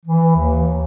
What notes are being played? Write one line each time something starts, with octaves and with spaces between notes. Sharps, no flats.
E3
D#2